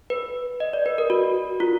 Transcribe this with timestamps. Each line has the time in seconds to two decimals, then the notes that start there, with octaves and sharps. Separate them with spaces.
0.10 B4
0.60 D#5
0.73 D5
0.86 B4
0.98 A#4
1.10 F#4
1.60 F4